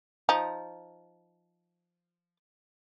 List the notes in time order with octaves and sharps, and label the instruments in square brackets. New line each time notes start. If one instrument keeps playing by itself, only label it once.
[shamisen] F3 D#4